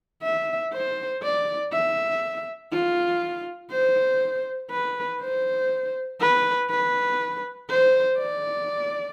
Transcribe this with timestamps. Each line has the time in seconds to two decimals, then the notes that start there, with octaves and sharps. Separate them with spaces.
0.23 E5
0.73 C5
1.23 D5
1.73 E5
2.72 F4
3.71 C5
4.70 B4
5.21 C5
6.20 B4
6.70 B4
7.69 C5
8.19 D5